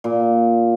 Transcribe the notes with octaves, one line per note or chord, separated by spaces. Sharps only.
A#2